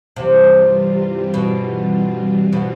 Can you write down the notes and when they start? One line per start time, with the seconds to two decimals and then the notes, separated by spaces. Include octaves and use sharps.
0.15 G2 C3 E3 G3 C4 F4
1.34 B2
2.53 B2